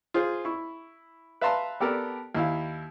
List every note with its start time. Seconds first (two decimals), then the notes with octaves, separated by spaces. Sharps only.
0.14 F4 G#4 C5
0.45 E4 C#6
1.41 B4 E5 F5 A5 A#5 C6
1.80 B3 G4 A4 A#4 D5 A5
2.35 D#2 E4 F5